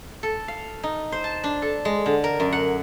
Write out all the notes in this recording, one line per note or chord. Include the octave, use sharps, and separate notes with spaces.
A4
F5
D#4
C5
A5
D4
A4
G#3
D3
A#4
F#2
F#5